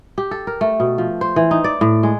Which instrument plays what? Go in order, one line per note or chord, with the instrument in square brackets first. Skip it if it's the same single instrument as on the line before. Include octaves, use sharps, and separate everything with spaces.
[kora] G4
A4
A#4
A3
B2
F3
C5
E3
D#4
D5
A2
G#3